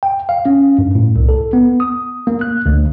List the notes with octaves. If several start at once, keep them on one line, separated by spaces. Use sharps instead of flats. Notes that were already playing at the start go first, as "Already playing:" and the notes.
G5
F5
C#4
G2
A2
C2
A4
B3
D#6
A#3
F#6
D2